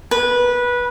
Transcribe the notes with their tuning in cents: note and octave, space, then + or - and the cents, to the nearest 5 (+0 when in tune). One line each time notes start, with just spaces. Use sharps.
B4 -15